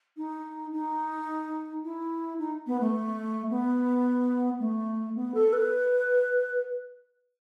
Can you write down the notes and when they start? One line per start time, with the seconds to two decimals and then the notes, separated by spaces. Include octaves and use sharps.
0.17 D#4
0.72 D#4
1.84 E4
2.39 D#4
2.67 B3
2.80 A3
3.50 B3
4.60 A3
5.15 B3
5.34 A4
5.53 B4